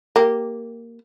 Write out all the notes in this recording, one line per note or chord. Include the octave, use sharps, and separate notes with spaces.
A#3 G4